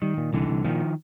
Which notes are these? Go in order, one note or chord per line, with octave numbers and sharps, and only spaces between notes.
D#3 G3
A#2
C2 D3 E3
C2
A#2 D#3 F3